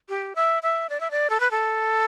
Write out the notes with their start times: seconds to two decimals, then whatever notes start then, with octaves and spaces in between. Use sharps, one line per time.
0.09 G4
0.35 E5
0.63 E5
0.89 D5
1.00 E5
1.11 D5
1.30 A4
1.40 B4
1.51 A4